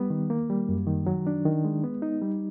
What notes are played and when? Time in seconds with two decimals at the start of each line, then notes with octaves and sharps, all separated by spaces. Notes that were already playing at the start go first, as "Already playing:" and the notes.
Already playing: G3 B3
0.10 D#3
0.30 A#3
0.50 G3
0.69 F#2
0.87 D#3
1.07 F#3
1.27 D4
1.45 D#3
1.65 G#3
1.84 B3
2.02 D#4
2.21 G3